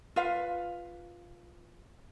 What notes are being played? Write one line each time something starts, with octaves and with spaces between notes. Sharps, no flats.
F4 B4 F5